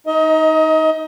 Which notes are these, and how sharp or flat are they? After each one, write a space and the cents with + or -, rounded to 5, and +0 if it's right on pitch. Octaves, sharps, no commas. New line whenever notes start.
D#4 +10 D#5 +30